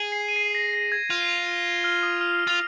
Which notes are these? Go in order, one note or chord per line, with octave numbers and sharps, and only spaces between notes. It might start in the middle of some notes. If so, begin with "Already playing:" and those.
Already playing: G#4
C7
D#7
C7
A#6
A#6
G#6
F4
F6
D#6
F6
F6
F4